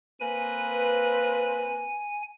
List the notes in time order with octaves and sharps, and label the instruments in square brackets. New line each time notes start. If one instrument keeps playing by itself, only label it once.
[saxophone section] A#3 C4 B4 [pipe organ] G#5